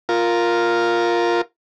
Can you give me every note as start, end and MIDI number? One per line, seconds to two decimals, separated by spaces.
0.09 1.41 65
0.09 1.41 70